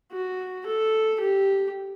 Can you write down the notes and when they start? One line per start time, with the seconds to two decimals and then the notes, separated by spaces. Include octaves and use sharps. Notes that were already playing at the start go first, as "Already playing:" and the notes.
0.12 F#4
0.67 A4
1.21 G4